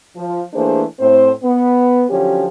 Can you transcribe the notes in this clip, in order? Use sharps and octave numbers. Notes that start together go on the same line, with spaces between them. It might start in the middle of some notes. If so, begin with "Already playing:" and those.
F3
E3 A3 A#3 D4 G#4 C5
A2 C4 C5
B3
D3 F3 F#3 C#4 G4